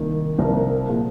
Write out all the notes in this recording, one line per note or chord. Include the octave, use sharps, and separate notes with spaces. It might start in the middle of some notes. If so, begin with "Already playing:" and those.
Already playing: C2 C3 D#3 A#3
C2 C3 F3 A#3 A#4
A#2 F3 G#4